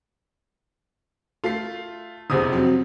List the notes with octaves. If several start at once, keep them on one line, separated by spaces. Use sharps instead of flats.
A3 F4 C7
F1 E2 C3 G#4 D#6
F3 F#3 C4